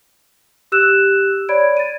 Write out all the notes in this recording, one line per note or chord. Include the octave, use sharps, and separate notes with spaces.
G4 E6 F#6 E7
C#5 D5 B5 G#6 D7
A6 D#7